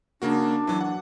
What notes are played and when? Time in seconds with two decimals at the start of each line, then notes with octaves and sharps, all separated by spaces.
0.22 C#3 A#3 D4 F#4
0.67 E3 F#3
0.81 F#5